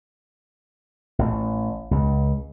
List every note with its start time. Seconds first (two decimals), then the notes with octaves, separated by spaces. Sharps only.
1.19 A1
1.91 C#2